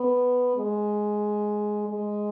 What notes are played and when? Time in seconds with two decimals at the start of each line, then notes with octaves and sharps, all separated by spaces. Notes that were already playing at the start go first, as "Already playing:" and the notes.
Already playing: B3
0.57 G#3
1.89 G#3